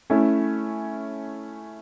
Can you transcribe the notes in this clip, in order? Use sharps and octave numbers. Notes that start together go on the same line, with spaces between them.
A3 C#4 E4